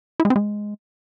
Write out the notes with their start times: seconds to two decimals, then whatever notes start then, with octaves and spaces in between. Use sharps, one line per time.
0.20 E4
0.25 G#3
0.30 C4
0.36 G#3